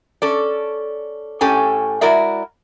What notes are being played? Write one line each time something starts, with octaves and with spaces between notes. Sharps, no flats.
C#4 A4 D5
A2 C#4 G4 A4 G#5
G#3 E4 F#4 A#4 D5 E5